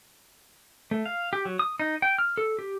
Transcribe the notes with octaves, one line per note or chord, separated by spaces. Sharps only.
A3
F5
G4
F#3
D#6
D#4
G5
F6
A4
G4